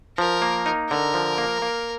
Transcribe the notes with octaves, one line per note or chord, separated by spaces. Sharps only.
F3 A#4
A#3
D#4
D3 A#4
F3
A#3
A#3